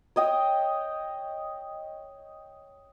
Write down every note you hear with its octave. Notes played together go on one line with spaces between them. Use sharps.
C#5 D#5 G5